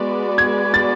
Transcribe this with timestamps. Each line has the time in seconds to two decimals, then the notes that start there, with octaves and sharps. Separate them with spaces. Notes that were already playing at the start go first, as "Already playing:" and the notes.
Already playing: G#3 B3 F#4 B4 D5
0.38 G#6
0.74 A6